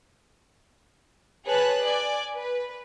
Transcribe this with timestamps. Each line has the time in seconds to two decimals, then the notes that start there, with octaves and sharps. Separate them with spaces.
1.46 G#4 B4 C#5 A5 F#6
1.85 D5 G#5
2.36 B4